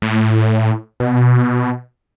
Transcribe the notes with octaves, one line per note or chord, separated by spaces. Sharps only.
A2
B2